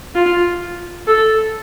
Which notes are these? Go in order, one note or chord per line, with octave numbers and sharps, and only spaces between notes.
F4
A4